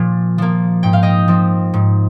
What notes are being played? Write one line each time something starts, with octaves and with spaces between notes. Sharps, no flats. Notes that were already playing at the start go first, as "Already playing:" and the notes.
Already playing: A#2 F3 A#3
F3 A#3
G#2 G5
F5
D#5 G5
F3 C4
G#2